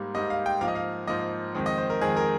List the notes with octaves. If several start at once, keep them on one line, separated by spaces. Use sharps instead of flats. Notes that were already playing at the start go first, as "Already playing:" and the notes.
Already playing: G#2 G3 A#3
G#2 G3 A#3 D#5
F5
G5
G#2 F3 A#3 F5
D#5
F5
G#2 F3 A#3 D#5
F2 D#3 G#3 C4
D#5
C5
A#4
F2 D#3 G#3 C4 G#4
A#4